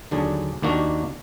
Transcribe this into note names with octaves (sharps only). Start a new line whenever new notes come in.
D#2 D3 F#3 D4 G#4
D#2 D#3 A#3 D4 F#4